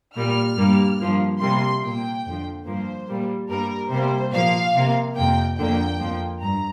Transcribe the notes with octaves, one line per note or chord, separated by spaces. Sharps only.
A#2 G3 A#3 F6
G2 G3 A#3
G2 F3 A#3
C3 G3 A#3 C6
A#2 A#3 G5
F2 D3 F3
G2 F3 A#3 C5
A#2 G3 A#3
G2 G3 A#3 A#4
C3 G3 A#3 C5
A#2 F3 A#3 F5
C3 A#3
F2 C3 A#3 G5
F2 D3 A#3 G5
F2 F3 A#3
G2 A#5